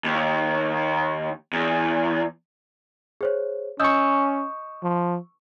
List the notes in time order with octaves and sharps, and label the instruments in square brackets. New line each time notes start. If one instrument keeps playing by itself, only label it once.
[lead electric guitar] D#2
E2
[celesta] G#4 C5 C#5
[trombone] C#4 [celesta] D#5 D#6 G6 [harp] C#6 E6
[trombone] F3